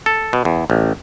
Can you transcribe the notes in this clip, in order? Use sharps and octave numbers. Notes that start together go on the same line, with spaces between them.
A4
B2
E2
A1